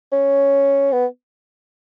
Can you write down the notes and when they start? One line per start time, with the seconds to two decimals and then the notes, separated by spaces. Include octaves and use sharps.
0.12 C#4
0.92 B3